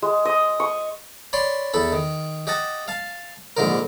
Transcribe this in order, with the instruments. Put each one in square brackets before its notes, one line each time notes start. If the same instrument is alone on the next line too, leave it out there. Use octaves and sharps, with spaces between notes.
[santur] G#3
D#5
C#6
[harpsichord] C#5 D5 B5 C6
E2 A4 B5
D#3
G4 D#5 F#5 A5
F5 A5
A#1 G#2 D3 A#4